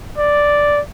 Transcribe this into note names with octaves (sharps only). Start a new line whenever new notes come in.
D5